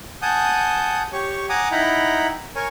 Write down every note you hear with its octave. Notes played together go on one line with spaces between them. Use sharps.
F#5 G#5 A5 D#6 G6
G4 C#5 C#6
F#5 G#5 A#5 D6 D#6
D#4 E4 F#5 G5 A#5 B5
A#4 C#5 G#5 C#6